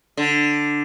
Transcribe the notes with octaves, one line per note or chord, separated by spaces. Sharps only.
D3